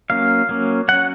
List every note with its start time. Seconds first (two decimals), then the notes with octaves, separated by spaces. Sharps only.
0.10 F#3 A#3 C#4 F5
0.49 F#3 A#3 C#4
0.88 F#3 C#4 F#5